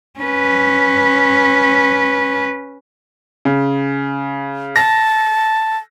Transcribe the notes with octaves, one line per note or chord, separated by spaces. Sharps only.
C#4 B4
C#3
A5 A#6